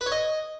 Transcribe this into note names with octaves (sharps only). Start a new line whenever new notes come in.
B4
C#5
D#5